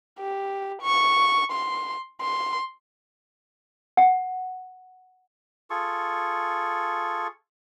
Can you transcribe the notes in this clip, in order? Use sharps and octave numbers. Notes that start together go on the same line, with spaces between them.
G4
C#6
C6
C6
F#5
F4 G#4 A4 C#6